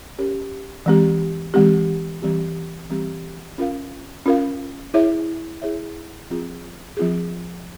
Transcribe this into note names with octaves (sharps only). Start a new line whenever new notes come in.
C#4 G4 A#4 C#5
E3 G#3 C4 G4
E3 G#3 C4 G4
E3 G3 C4 G4
E3 G3 C4 G4
C#4 F4 A#4 F5
C#4 F4 A#4 F5
E4 G#4 C#5 E5
E4 G#4 C#5 E5
F3 C4 F4 G#4
F3 C4 F4 G#4